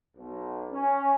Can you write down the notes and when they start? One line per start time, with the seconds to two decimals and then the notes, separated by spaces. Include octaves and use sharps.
0.17 B1
0.72 C#4